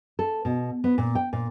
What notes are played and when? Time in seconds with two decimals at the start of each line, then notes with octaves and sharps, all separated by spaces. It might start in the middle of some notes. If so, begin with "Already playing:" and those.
0.19 A4
0.45 B2
0.84 B3
0.98 A#2
1.15 G5
1.33 A#2